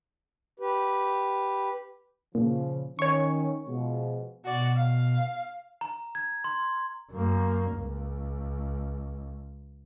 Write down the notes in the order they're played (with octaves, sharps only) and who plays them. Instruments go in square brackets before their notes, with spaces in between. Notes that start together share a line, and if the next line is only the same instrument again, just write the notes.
[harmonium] G4 B4
[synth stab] A#2 [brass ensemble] C#3 F3
[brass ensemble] D#3 C#4 [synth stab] C#5 C#6
[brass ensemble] B2 F3 G#3
[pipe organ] B2 [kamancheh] F#4 D5
[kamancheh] F5
[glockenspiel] A#5
G#6
C6
[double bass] F#2 A#3
C#2